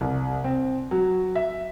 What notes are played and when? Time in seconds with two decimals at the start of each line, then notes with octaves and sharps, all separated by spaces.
0.01 C2
0.44 C4
0.91 F#3
1.35 E5